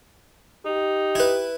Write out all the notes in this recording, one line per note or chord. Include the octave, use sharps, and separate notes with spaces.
D#4 G4
E4 B4